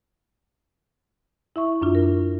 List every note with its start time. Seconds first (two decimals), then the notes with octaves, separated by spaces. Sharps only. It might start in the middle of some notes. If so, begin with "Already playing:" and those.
1.56 E4 E5 C#6
1.82 F#2 D4 F4
1.95 A#4